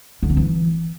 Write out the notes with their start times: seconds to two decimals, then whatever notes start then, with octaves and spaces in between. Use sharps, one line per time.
0.23 D3
0.30 C4
0.37 E3